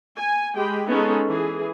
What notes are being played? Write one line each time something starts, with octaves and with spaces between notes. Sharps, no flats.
G#5
G#3 G4 G5 B5
G#3 B3 C#4 D#4 G#4 A4
E3 G#4